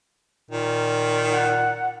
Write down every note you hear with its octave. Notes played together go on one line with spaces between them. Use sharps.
A#2 D#3
F#5